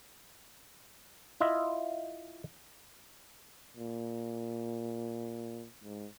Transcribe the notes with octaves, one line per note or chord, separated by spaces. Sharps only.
E4 F4 D#5 E5
A#2
G#2